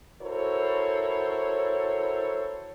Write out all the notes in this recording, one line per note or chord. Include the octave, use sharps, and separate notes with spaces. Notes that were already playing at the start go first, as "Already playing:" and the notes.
E4 F#4 A4 A#4 C5 C#5